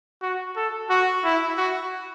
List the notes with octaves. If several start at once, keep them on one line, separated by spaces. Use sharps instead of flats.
F#4
A4
F#4
E4
F#4